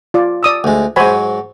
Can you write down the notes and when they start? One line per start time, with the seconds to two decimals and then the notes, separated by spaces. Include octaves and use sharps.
0.14 F4 D5
0.43 D5 D#6 E6
0.64 D2 G#3
0.96 G#2 F#3 C5 G#5 B5